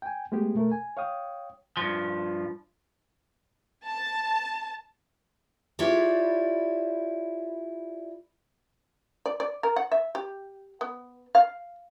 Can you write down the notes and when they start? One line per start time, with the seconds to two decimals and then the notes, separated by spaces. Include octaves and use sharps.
0.02 G5 G#5
0.32 G#3 A3 B3 G4 G#4
0.55 B2 A3 A#4
0.72 G#5
0.97 C#5 F5 G5 D#6
1.77 G2 F3
3.87 A5
5.79 E4 F4 G4 B4 C#5 D5
9.26 D5
9.40 D5
9.63 A#4
9.76 F#5
9.92 E5
10.15 G4
10.81 B3
11.35 F5